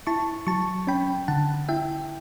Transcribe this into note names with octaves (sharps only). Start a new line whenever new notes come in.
E4 A5 C#6
F#3 A5 C#6
C#4 G5 B5
D3 F#5 A5
E4 E5 G5